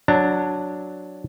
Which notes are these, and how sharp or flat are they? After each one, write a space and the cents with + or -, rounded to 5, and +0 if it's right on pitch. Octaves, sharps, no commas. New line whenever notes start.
F#3 -5 D4 +0 A#5 -35